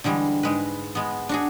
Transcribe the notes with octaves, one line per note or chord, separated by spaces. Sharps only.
D3 E3 G3 G#3
G#2 G#3 B4
G#3 B3
D4 F#4 G#4